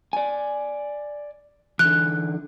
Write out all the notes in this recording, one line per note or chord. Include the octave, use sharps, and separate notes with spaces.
D5 G#5
D3 E3 F#6